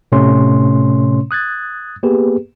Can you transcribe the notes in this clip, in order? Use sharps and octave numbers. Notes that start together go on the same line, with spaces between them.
A2 C3 A3 C#4 C#5 C6
D#6 F#6 G#6 A6
A#3 B3 G4 G#4 B4